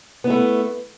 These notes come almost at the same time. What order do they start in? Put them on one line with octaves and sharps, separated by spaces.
B3 E4 A3